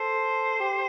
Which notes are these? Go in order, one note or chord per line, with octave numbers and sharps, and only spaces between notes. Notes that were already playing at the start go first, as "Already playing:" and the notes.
Already playing: A4 C5
G4